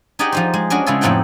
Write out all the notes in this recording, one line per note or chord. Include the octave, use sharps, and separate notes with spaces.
D#4 G4 G#4 D5 D#5 F#5
F3 D#4 C5
G#3
C#4 D4 F#4 D#5
C#3 G#3 E4 F4 G#4 A4
F2 A2 C4 D#4 F#5 G5